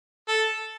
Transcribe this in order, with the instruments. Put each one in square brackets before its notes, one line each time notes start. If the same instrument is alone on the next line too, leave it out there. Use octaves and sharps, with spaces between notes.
[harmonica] A4